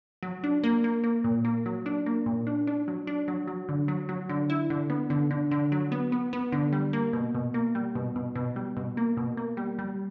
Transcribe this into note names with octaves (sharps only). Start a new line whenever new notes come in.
F#3
D4
A#3
A#3
A#3
A#2
A#3
F#3
D4
A#3
A#2
D4
D4
F#3
D4
F#3
F#3
D3
F#3
F#3
D3
E4
D3
B3
D3
D3
D3
F#3
B3
B3
B3
D3
G3
A#3
B2
B2
A#3
G3
B2
B2
B2
G3
B2
A#3
B2
A#3
G3
G3